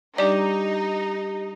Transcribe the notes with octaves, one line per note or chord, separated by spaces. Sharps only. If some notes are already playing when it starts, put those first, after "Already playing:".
G3 D4 D#4 G4 D5